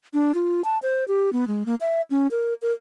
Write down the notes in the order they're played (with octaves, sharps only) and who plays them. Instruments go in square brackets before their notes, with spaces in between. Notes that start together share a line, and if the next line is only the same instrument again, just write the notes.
[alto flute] D4
F4
A5
C5
G4
B3
G#3
A#3
E5
C#4
A#4
A#4